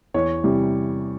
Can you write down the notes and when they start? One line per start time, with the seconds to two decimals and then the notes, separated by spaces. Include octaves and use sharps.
0.14 E2 C#5
0.44 C3 E3 G3